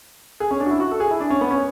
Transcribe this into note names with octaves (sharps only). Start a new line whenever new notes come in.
G#4
C#4
D4
F#4
E4
F#4
A4
G#4
E4
D4
C#4
B3
C#4